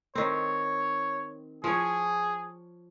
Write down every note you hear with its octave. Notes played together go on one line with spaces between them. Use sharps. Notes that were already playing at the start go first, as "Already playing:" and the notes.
D#3 C4 C#5
F3 G#4 C#5